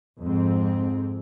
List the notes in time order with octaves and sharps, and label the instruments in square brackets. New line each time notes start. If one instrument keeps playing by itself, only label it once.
[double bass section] F2 G#2 C4